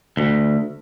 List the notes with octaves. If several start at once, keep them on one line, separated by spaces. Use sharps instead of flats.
D2